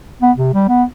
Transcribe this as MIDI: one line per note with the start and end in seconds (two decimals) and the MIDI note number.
0.22 0.32 59
0.37 0.52 48
0.54 0.63 55
0.68 0.83 59